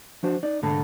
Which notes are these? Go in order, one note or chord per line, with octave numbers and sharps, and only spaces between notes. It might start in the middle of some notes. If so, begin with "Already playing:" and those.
F3 D4 F#4 C5
D#4 D5
C2 G#2 D3 A3 A4 B5